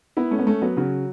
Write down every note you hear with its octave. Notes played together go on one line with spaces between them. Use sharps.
B3 E4
A3 C#4
B3
A3 C#4
F#3 B3
C#3 F#3